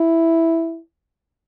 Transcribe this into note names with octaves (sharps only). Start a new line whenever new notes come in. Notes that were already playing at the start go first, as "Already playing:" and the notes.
Already playing: E4